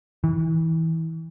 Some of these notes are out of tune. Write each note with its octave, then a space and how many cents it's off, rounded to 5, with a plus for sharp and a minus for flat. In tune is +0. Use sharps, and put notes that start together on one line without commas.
E3 -30